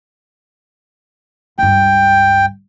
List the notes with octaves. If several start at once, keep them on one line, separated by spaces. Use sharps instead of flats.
C#2 G2 G5